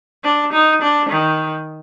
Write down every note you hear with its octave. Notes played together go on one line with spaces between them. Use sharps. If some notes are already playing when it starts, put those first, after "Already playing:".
D4
D#4
D4
D#3